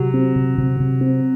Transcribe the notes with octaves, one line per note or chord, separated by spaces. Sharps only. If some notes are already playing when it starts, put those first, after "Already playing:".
Already playing: C3 F#3
C4
C3
C3
C3
C4